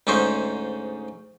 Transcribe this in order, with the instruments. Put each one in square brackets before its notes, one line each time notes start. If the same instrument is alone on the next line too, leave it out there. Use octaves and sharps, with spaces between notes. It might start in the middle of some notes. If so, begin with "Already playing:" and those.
[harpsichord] D2 G#2 C#4 D#4 C5